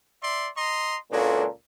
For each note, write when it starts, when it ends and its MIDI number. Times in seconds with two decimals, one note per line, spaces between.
0.23 0.48 74
0.23 0.48 76
0.23 0.48 84
0.56 0.96 75
0.56 0.96 82
0.56 0.96 84
1.12 1.46 37
1.12 1.46 46
1.12 1.44 56
1.12 1.44 62
1.12 1.44 66
1.12 1.46 69